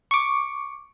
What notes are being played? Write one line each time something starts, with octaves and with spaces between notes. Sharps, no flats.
C#6 D6